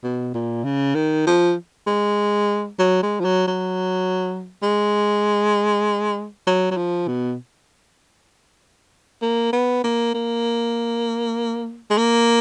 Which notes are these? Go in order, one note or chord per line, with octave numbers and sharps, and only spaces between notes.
B2
A#2
C#3
D#3
F3
G#3
F#3
G#3
F3
F#3
F#3
G#3
F#3
F#3
F3
B2
A#3
B3
A#3
A#3
G#3
A#3